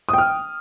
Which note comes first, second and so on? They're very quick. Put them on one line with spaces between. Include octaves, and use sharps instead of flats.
D#6 G5 F6